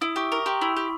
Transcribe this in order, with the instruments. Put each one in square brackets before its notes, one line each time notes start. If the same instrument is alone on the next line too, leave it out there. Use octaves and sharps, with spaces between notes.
[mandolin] E4 [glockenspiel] D#6
[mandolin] G4 [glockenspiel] C#6
[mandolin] A#4 [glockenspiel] C#6
[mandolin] G4 [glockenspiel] C6
[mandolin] E4 [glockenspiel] B5
[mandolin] G4